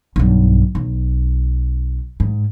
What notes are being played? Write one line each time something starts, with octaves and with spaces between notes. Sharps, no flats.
B1 G2
B1
G#2